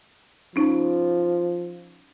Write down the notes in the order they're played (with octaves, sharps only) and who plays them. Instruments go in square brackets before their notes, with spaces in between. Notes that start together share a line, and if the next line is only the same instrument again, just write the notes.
[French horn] F3 [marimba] C#4 D#4